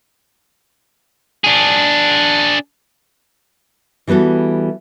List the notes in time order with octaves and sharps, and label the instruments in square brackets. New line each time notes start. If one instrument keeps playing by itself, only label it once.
[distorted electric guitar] D4 G#4
[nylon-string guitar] E3 G3 B3 F#4 A4